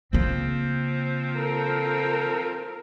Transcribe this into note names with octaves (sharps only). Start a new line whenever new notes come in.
C#3 F3 A#3 C4
A4 A#4